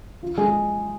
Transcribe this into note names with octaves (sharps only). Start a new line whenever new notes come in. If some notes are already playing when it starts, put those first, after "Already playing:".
F4
G#3 G#4